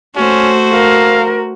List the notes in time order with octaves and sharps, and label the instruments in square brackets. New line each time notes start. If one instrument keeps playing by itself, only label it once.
[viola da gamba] A3 C5 [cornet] C#4 [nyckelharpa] F#4
[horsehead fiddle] A#4 [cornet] F5